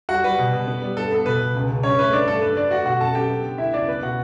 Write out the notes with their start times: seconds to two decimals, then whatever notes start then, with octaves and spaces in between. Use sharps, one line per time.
0.09 G3 F#4 F#5
0.24 G3 B4
0.39 B2
0.53 B2
0.67 B3
0.82 G3
0.97 G2 A4
1.12 B3 A4
1.26 B2 B4
1.40 B2
1.55 C#2
1.69 C#3
1.83 G2 C#4 C#5
1.98 A3 B4
2.13 G2 D4 D5
2.28 G2 A4
2.42 G2 B4
2.56 D3 D4 D5
2.71 A3 F#4 F#5
2.86 B2 F#4 F#5
3.01 F#2 A4 A5
3.15 F#2 G4 G5
3.30 B3
3.44 D3
3.58 B3 E4 E5
3.73 C#2 D4 D5
3.88 B3 B4
4.02 B2 F#4 F#5